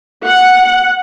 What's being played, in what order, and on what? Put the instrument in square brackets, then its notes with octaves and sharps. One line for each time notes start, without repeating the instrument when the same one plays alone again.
[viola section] F#5